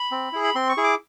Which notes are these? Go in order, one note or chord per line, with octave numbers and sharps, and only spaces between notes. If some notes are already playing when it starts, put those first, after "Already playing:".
Already playing: B5
C4
E4 G#4
B5
C4 C6
C#6
E4 G#4
D6